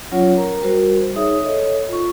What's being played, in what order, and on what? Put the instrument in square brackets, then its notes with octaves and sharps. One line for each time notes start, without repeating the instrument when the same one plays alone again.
[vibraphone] F#3 C#4 F4 C#5 F#5
A#4 A#5
G3 F#4 A#4 C5
D#4 G#4 C#5 E5 D#6
A4 C#5 D#5
F4 C#6